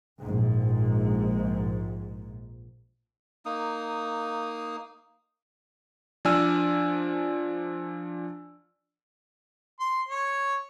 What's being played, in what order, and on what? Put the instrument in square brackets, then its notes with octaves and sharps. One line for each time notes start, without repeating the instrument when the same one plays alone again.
[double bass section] A#1 G#2
[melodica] A#3 D#4 D#6
[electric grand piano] F3 D4 D5 G#5 E6 F6
[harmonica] C6
C#5